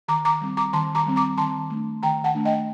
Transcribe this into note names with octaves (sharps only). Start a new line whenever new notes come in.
D#3 A#5 D6
A#5 D6
G3 C4
A#5 D6
D#3 A5 C6
A#5 D6
G3 C4
A#5 D6
D#3 A5 C6
A3 D4
D#3 G5 A#5
F#5 A5
A3 D4
D#5 G5